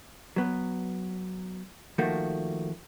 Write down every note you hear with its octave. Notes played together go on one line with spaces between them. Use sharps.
F#3 B3
D#3 F3 A3 A#3 F#4